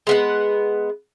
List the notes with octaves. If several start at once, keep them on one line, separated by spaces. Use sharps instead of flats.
G#3 B3 F#5